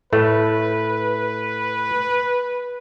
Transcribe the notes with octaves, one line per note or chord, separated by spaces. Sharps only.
A2 A3 B4